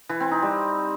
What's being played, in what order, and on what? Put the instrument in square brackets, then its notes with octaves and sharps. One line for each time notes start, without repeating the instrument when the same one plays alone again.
[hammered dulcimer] E3
C4
D#4
G3